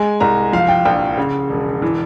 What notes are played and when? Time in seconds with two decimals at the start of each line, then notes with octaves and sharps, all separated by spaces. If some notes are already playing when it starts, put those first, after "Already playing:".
Already playing: G#3 G#5
0.20 C2 A#5
0.53 F3 F5
0.68 G5
0.85 A#1 G5
1.18 C#3
1.50 E1
1.82 E3